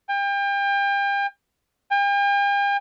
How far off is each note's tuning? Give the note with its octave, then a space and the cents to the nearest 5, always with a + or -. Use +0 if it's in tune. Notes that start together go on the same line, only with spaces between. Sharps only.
G5 +35
G5 +45